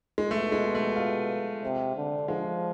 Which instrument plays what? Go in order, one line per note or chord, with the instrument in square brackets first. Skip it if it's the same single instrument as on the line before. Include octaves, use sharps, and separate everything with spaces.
[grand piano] G#3
[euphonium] B2 [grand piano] A3
[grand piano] G#3
A3
F4
[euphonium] C3
D3
[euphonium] F3 [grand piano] G#3